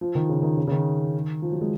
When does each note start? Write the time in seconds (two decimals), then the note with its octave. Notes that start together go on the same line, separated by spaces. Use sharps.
0.01 F3
0.15 D#3
0.29 C#3
0.43 D#3
0.57 C#3
0.67 C#3
0.71 D#3
1.42 F3
1.52 F#3
1.61 G#3